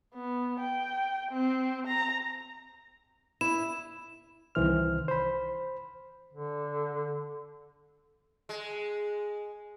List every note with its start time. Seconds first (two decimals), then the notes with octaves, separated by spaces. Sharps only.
0.15 B3
0.60 G5
1.32 C4
1.87 A#5
3.41 E4 E7
4.55 C2 D#3 E3 C5 F6
5.08 C5 B5
6.33 D3
8.49 G#3